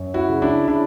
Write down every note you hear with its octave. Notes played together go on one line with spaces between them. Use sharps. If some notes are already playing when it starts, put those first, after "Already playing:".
Already playing: F#2
E4 F#4
C#3
D4 E4
C#3 D4 E4